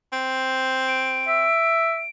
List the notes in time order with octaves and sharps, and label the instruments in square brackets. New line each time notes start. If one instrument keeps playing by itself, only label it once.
[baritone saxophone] C4
[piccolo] D7
[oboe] E5